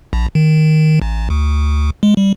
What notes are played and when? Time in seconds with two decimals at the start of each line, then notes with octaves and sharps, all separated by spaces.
0.13 A#1
0.35 D#3
1.02 A1
1.30 D2
2.03 G#3
2.17 G3